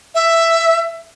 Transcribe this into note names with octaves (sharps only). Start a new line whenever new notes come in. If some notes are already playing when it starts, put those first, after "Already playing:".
E5